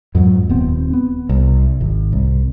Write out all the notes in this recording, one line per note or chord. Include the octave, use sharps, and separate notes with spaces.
F2 G#2 F#3
D#1 B3 C4
B3
C2
G#1
C2